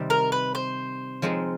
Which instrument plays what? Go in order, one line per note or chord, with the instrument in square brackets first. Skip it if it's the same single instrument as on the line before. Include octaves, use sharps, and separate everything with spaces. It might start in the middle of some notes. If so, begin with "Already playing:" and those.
Already playing: [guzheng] C3 D#3 G3 C4
[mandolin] A#4
B4
C5
[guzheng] F3 G#3 C4 D#4